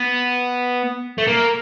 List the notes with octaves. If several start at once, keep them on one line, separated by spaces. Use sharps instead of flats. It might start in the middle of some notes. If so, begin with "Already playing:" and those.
Already playing: B3
A3
A#3